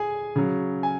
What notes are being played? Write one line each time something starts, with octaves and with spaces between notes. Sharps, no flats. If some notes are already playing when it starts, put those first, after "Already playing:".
Already playing: G#4 G#5
C#3 F#3
G#5